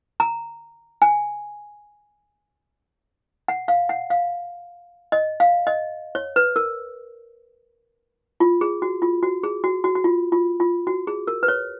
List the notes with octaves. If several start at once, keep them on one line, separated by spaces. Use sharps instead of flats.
A#5
G#5
F#5
F5
F#5
F5
D#5
F5
D#5
C#5
B4
A#4
F4
G#4
F#4
F4
F#4
G#4
F#4
F#4
F#4
F4
F4
F4
F#4
G#4
A#4
B4
C#5